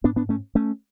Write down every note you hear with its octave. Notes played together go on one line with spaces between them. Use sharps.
G#2 B3 D4
B3 D4
A3 C#4
A3 C#4